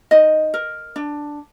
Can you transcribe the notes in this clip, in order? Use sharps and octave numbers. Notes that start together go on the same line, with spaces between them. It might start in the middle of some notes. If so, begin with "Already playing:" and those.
D#4 D#5
A#4
D4